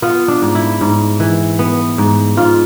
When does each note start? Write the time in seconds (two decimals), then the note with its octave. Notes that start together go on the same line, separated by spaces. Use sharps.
0.02 B3 F4
0.28 D4
0.42 G#2
0.55 E4
0.81 G#2
1.20 E3
1.59 B3
1.98 G#2
2.37 G#2 F4